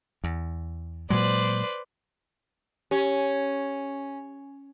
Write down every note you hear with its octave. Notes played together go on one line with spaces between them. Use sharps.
E2
A#2 F#3 G#3 B4 C5 D5
C#4 G4